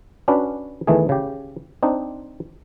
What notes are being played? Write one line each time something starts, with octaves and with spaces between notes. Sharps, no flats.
C#4 D4 F#4 B4
E2 D#3 E3 A3 G#4
C#3 G4
C4 D4 D#4